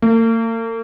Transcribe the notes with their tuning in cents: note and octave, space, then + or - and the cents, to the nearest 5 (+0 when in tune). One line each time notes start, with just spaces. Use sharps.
A#3 -45